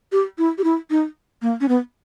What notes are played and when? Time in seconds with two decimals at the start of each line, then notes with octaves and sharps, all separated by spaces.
0.12 G4
0.38 E4
0.58 G4
0.64 E4
0.90 D#4
1.42 A#3
1.61 C#4
1.68 B3